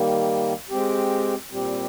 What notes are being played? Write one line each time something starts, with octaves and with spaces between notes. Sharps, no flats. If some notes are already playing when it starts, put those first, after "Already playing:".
Already playing: D#3 G3 A#3
G#3 C4 G4
A#2 G3 C4 G4